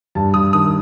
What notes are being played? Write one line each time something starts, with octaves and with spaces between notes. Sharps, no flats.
G2 A5
G2 D#6
D#3 D#6